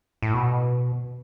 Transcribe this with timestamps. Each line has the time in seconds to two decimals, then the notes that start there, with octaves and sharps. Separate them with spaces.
0.22 A2
0.34 B2